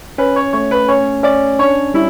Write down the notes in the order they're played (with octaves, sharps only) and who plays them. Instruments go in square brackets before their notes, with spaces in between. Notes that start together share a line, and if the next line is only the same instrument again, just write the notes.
[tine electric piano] C#4 [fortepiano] B4
[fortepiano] C#5
[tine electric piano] A3 [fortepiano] C#5
[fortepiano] B4
[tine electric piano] C#4 [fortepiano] C#5
[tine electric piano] C#4 [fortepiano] D5
[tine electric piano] D4 [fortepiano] C#5
[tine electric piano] G3 [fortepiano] E4